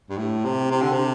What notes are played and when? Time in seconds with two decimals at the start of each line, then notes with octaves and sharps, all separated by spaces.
0.10 G2
0.18 A2
0.45 C3
0.71 C3
0.82 D3
0.93 C3